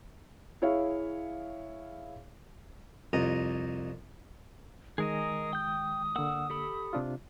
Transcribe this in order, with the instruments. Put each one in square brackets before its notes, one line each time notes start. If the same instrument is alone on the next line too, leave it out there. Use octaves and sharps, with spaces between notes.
[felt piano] E4 G#4 C#5 E5 F5
[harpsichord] C2 F2 D#5 A#5
[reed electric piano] D#3 G#3 [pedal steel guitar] G#4 A#4 D#5 [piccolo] D#6
[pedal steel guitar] G5 G6
[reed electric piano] D3 A#3 [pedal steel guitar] F#5 E6
[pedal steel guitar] G4 A4 B5
[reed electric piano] C3 D4 F4